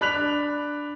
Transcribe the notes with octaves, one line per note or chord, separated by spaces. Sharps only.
D4 B5 F#6 B6 F7